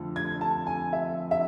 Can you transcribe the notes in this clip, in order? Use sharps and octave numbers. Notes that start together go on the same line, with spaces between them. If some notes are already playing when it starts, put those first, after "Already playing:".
Already playing: F2 D3 F3 A3
G#6
A5
G#5
E5
E5